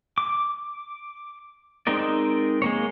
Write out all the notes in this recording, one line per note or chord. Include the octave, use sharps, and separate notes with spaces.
D6
G#3 C4 D#4 A#4 D5
G#3 A#3 C#5